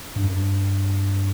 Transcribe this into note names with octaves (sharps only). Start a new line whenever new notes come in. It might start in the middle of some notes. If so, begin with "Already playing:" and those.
G2
F#2
G2